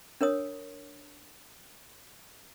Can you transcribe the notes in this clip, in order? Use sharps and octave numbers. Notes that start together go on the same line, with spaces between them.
D4 A#4 C#5 D#6